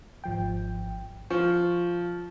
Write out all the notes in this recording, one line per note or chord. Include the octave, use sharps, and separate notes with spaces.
G#1 F3 G5
F3 C#6